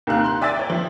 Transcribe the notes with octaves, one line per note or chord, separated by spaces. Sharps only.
D#2 C3 F5 F#6
C6 F#6
D5 E5 G#5 D6 E6 A6
C#5 G5
F3 E5